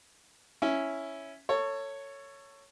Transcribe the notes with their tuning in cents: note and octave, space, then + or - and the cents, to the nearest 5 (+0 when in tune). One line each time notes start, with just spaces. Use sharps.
C#4 +0 E4 +0
A4 +30 C#5 +0